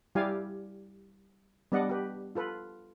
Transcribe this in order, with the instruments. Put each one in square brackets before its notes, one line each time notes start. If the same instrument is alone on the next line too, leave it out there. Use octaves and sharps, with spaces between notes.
[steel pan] G3 E4 G4 D5 F5 G#5
G3 B3 D4 D5 D#5 F#5
G4 B4
F4 A4 B4